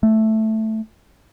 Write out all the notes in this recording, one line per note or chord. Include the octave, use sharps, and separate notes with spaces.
A3